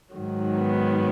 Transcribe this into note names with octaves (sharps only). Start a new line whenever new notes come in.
G#2 D#3 F#3
B3